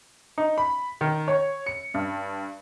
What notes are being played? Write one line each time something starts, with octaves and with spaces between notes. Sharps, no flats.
D#4
B5
D#3
C#5
C#7
G2